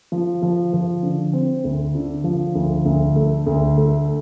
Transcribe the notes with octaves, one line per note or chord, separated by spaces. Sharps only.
F3
F3
F3
D3
C4
D2
D3
F3
D2
D2
A3
D2
A3